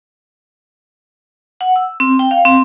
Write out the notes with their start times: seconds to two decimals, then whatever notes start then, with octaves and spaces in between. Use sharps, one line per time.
1.61 F#5
1.76 E6
2.00 C4
2.19 G5
2.31 F5
2.45 C4